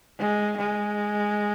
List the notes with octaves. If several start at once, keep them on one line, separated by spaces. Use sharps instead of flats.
G#3
G#3